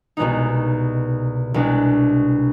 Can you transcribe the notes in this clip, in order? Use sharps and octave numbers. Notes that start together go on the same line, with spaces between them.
C2 B2 G#3 B3 D#4
C2 B2 G#3 D4